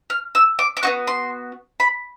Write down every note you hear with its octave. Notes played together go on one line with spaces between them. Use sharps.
F6
E6
D6
D6
B3 D#4 F#4 C#6
C6
B5